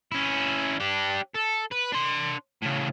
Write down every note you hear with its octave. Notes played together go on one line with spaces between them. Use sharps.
C#4 E4
D4 G4
A4
B4
D4 C6
A2 C#3